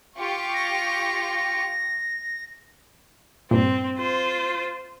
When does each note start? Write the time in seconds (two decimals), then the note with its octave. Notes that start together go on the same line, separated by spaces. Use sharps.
0.18 F4 G4 C#6
0.54 A#6
3.51 G2 A#2 C4
3.98 F4 C5